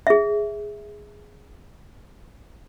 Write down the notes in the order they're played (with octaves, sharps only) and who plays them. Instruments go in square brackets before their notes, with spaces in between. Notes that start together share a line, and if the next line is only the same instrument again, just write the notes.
[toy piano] G#4 E5